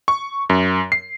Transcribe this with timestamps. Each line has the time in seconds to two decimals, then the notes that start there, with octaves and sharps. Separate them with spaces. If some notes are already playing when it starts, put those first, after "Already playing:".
0.08 C#6
0.50 F#2
0.92 C7